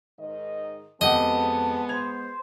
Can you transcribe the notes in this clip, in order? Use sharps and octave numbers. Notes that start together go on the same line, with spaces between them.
G#2 D#3 D#5
F2 G#3 B3 G4 D#5 F#5 A5
C5 G#6 F7